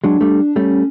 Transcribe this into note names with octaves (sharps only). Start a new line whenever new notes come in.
F#3 G#3 D4
G3 A3
G3 A3 C#4